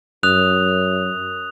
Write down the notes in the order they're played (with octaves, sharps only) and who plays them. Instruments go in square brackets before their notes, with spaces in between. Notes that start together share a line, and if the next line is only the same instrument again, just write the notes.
[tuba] F#2 [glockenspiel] D#6 F#6 F7